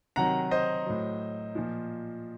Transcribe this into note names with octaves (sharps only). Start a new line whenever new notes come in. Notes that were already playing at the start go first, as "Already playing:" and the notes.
C3 D#3 F#3 F#5 A#5
C5 D#5
A2 F#3
A#2 F3